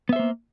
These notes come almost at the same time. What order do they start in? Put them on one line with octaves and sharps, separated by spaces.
B3 E5 C5 A#3